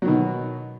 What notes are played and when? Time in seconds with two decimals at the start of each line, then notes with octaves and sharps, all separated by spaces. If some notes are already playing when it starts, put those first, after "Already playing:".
0.02 F#3
0.05 D#3
0.08 B2